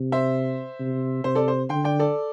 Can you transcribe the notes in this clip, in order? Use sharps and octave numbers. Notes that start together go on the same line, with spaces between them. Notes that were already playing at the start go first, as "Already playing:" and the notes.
Already playing: C3
C5 E5
C3
C3 C5
A4 D5
C5
D3 G5 C6
D5 G5
A4 D5